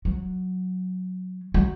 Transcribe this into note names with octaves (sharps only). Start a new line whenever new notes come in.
F#3
F#3